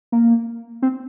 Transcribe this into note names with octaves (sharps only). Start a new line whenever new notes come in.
A#3
C4